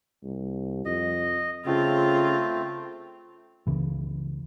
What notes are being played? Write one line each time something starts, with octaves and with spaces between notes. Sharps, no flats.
C2
F2 D#5
C#3 A3 C4 F4
C#2 C#3 E3